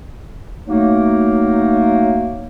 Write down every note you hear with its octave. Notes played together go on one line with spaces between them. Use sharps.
F#3 A3 A#3 D#4